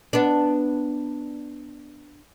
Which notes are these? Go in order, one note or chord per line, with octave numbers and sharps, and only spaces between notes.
B3 D4